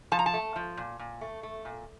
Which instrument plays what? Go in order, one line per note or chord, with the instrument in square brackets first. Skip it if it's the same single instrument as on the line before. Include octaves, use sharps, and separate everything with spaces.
[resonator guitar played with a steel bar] F3 A5
A#5
A5
A3
F3
A#2
A#2
A3
A3
A#2